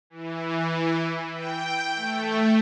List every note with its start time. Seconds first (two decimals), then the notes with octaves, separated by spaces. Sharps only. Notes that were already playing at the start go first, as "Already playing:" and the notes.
0.10 E3
1.34 G5
1.96 A3